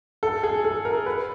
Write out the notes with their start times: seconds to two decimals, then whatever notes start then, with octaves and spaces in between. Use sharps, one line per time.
0.23 A4
0.43 G#4
0.65 A4
0.85 A#4
1.06 B4